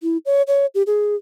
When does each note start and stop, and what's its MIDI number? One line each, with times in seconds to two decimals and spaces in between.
0.03 0.17 64
0.26 0.42 73
0.48 0.66 73
0.75 0.83 67
0.87 1.16 68